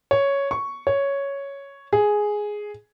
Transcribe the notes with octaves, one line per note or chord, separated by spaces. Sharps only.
C#5
C#6
C#5
G#4